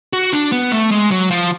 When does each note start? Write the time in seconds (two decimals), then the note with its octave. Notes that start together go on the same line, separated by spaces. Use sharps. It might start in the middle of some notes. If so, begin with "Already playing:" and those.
0.13 F#4
0.33 D4
0.52 B3
0.72 A3
0.91 G#3
1.11 F#3
1.31 F3